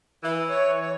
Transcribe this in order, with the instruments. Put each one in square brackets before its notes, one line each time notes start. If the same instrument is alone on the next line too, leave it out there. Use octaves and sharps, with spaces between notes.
[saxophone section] E3
[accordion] C#5
C#5